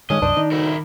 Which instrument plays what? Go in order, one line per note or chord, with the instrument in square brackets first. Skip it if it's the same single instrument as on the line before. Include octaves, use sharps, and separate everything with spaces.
[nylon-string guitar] G2 G#3 [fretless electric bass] D#3 [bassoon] C#4 [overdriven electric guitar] D#5
[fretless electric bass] C2 F#2 [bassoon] D4 [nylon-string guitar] C5
[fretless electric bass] D#3 [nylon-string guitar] D#4
[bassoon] D2 [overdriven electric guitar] E4 A#4